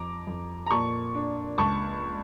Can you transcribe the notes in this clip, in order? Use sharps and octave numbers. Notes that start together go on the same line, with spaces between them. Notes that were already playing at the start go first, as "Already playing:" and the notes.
Already playing: F2 A#5 D6
F2
A#5
A#2 A5 C#6
D4
C#2 A5 C#6